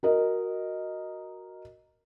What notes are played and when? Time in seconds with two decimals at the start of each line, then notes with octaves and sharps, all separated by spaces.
0.03 F#4 A#4 D#5